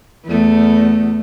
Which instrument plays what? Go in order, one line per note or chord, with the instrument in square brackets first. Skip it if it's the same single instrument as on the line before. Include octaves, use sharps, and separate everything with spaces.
[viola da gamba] E2 A3